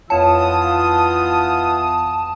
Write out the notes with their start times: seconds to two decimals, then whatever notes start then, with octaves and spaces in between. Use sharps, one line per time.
0.10 F2 E3 B3 F4 C#5 A5 D#6